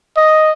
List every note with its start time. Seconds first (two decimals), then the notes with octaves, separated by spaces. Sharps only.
0.17 D#5